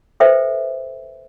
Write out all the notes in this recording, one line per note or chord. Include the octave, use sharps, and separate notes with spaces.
A4 B4 C5 E5 G5